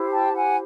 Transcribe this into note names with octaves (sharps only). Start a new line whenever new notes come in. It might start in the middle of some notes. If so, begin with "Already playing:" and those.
Already playing: E4 G4 C5
G5 A5
F#5 G#5